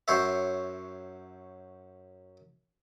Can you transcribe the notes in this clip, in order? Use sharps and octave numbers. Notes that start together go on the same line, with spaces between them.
F#2 C5 C#5 E5